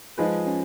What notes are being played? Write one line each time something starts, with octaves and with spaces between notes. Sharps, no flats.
F3 G#3 D#4 F4 G#4 B4
C#4